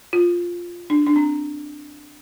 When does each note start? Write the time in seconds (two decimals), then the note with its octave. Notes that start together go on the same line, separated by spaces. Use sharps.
0.13 F4
0.90 D4
1.06 D4
1.16 C4